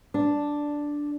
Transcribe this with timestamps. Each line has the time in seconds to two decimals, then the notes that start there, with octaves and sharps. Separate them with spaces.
0.14 D4